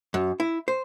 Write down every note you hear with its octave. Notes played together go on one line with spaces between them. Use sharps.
F#2
E4
C5